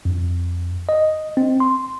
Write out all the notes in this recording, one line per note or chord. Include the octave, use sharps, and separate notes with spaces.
F2
D#5
C4
C6